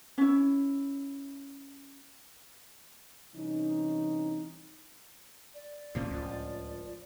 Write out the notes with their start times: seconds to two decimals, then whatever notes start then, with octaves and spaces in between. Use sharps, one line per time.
0.18 C#4 E4
3.34 C2 E3 C#4 D#4
5.54 D5
5.95 D2 A2 F3 A#3 C#4
6.11 C#2